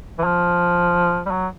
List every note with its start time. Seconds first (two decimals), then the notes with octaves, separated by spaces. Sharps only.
0.18 E3
0.24 F3
1.26 G3
1.31 F#3